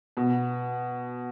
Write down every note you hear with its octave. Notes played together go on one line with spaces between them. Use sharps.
B2